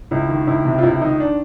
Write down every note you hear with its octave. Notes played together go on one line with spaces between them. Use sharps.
C#2 E4
D#3
C#2 E4
C3
F4
C#2 E4
D#3 D#4
D4